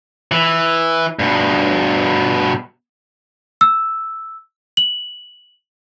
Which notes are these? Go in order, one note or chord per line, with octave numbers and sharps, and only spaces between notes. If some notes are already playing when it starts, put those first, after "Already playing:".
E3
G2 B2
E6
F#7